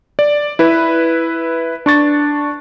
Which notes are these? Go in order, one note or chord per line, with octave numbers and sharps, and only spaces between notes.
D5
E4 B4
D4 C#6 A6